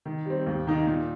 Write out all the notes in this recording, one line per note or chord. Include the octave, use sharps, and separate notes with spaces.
D#3
G3 C4
D#2
D#3 A#3 D#4
A#2